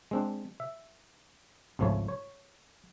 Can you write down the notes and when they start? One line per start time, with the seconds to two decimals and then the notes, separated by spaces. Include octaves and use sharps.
0.11 G#3 C4 D4
0.60 E5
1.79 G#1 C#2 F3 A3 C#5
2.08 C#5